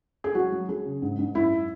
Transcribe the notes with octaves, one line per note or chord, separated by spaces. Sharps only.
G#4
F#3 F#4
F#3
F#3 G#4
C#3
G#2
G#2
F#2 E4